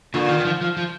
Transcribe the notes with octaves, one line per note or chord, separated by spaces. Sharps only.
A#2 D3
D#3
D#3
F3
F3
F3